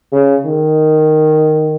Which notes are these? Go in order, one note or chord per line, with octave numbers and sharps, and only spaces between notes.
C#3
D#3